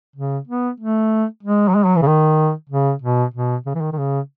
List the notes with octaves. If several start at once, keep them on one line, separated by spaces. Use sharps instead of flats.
C#3
B3
A3
G#3
F#3
G#3
F#3
E3
C#3
D#3
C#3
B2
B2
C#3
E3
D#3
D#3
C#3